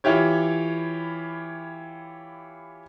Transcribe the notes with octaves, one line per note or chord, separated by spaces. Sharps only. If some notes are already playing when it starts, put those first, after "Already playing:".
E3 E4 F4 G4 C#5